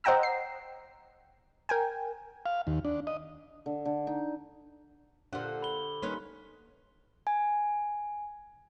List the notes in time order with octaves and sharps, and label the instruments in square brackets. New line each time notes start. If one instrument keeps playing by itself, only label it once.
[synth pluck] C5 D#5 F#5 G5 A#5 E6
C7
A#4 G5 G#5
[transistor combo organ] F5
D#2
D4
D#5
[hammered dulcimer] D3
D3
D#4
[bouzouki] A#2 F#5 [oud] D3 [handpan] D4 G4 C5
[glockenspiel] B5 G7
[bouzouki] D#3 C#4 B4 [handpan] G3 A#3 D#4 [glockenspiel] C6
[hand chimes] G#5